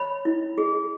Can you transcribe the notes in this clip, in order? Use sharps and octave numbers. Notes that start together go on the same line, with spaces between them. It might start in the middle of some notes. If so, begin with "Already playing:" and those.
Already playing: C#5 B5
E4
G#4